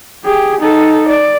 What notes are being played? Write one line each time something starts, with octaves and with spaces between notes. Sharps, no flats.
G4 G#4
D#4 A4
D5